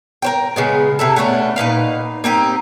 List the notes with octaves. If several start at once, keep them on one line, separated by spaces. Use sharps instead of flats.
A#4 C5 G5
C#3 G#3 B3
C3 E4 A4
A3 B3 C#4 D4
A#2 D#4 B4 F5
A#3 C4 D#4 G4